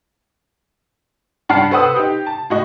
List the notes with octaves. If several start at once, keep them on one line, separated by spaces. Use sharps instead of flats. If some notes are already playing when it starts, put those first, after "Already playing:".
G2 D4 F#5 A5 F6 C7
A4 B4 C5 F#5 D#6 E6
D#4 G4
A5
A2 F#4 D#5